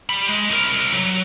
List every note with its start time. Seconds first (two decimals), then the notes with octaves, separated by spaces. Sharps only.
0.09 G3 B5
0.29 G#3
0.50 C2 A#4
0.93 F#3